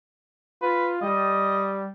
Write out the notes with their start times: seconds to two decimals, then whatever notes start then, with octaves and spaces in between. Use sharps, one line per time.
0.62 F4 B4
1.02 G3 D#5